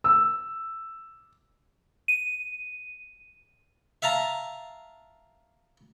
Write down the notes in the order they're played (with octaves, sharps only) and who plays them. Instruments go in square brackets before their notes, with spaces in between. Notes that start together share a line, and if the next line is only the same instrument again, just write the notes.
[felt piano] E6
[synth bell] D#7
[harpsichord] E5 F5 A5 A#5